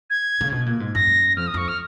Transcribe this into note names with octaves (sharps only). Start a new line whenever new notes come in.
G#6
C#3
B2
A#2
G#2
F#2 A#6
F2 F6
D#6
F2 C#6
F6